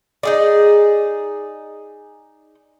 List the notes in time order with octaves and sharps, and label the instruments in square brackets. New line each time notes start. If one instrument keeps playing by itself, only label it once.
[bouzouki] D#4 G#4 D5